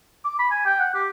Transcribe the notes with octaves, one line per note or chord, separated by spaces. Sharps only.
D6
B5
G#5
G5
F#5
G4